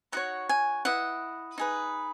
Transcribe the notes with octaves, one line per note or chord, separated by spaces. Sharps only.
D#4 F#4 C#5 F#5
G#5
E4 B4 D#5 F#5
D#4 G#4 B4